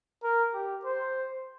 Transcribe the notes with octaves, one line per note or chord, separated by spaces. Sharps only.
A#4
G4
C5